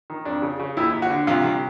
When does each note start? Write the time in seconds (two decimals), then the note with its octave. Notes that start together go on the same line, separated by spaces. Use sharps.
0.10 D#3
0.25 F2 D4
0.42 C#3
0.59 C#3
0.77 D#2 E4
0.93 D#2
1.02 F#4
1.10 D3
1.27 C2 F4
1.44 C2